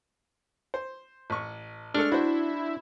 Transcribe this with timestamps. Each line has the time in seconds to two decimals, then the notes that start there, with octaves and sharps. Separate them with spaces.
0.74 C5
1.30 A1 C#6
1.94 G#3 A3 D4 A4 F6
2.12 E4 F#4 C5